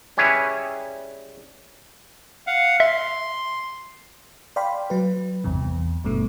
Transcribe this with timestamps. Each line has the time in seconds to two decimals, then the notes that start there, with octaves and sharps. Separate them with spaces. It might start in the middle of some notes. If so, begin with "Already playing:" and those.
0.17 G3 C#4 E4 G#4 B4 C#5
2.47 F5 F#5
2.80 E5 C6
4.56 D5 F5 G5 B5 C6
4.90 F#3 B4
5.44 A1 E2 G2 C3
5.62 E2
6.04 G#1 G2 B2 A3